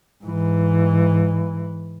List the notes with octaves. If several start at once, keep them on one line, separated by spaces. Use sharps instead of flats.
G#2 E3